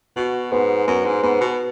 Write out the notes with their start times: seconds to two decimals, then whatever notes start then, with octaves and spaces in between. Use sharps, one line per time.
0.16 B2 F#4
0.52 G#2 B3
0.87 F#2 B3
1.05 G#2
1.23 G#2 B3
1.41 B2